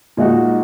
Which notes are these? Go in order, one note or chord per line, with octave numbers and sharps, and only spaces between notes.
A#2 G#3 D#4 F#4